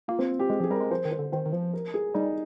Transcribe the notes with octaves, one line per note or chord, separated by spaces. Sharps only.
A#3 F4
C4
G4
G#3 G#4
F3
G#4
G3 A#4
G#3
F3 C5
D#3
C5
D3
D#3 C5
D#3
F3 C5
A#4
G#4
G3 D#4